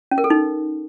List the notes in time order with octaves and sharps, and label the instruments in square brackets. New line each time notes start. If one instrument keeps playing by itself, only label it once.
[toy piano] C#4
A#4
A4
D#4